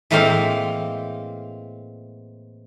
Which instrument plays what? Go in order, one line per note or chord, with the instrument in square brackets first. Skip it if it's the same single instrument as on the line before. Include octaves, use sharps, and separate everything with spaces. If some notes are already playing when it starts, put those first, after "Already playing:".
[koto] A2 E3 G#3 A#3 C4 F5